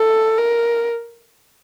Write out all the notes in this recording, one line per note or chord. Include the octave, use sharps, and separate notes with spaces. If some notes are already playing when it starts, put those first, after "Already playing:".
Already playing: A4
A#4